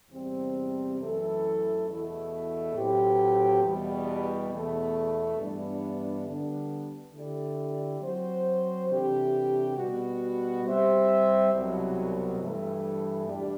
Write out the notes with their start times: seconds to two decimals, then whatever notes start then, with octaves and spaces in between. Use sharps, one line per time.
0.10 E2 C3 G3 C4
0.98 F#2 E3 A3 E4 A4
1.86 E2 B2 A3 E4
2.73 A2 F#3 C4 G4 B4
3.62 E2 B2 G3
4.49 E2 B2 A3
5.37 G2 E3 B3 D4
6.25 D3 G3 B3 D4
7.12 D3 A3 E4 G4 D5
8.00 F#3 C4 F#4 C5
8.88 C3 E3 A3 D4 G4
9.76 B2 G3 B3 F#4
10.64 G3 C4 G4 C5 E5
11.52 C2 B2 F#3
12.39 G2 E3 A3
13.27 E2 B2 G3 D4 G4